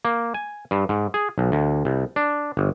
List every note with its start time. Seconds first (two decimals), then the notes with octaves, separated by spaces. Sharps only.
0.05 A#3
0.34 G#5
0.71 G2
0.89 G#2
1.14 G#4
1.38 B1
1.52 D2
1.85 C2
2.16 D4
2.57 G1